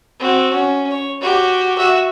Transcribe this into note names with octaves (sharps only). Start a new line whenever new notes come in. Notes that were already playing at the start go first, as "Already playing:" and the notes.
C4 F#4
C#4
C#5
F#4 G4
F#4 E5